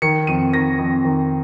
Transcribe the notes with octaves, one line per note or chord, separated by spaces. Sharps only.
D#3 C#7
F2 D#7
D#3 A#6
F2
D#3